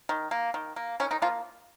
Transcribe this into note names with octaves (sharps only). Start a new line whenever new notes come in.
D#3
A#3
D#3
A#3
D#3 C#4
D#3 D#4
F3 A#3 F4